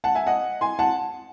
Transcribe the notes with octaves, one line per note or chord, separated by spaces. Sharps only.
F#5 A5
E5 G#5
D#5 F#5
G#5 C6
F#5 A5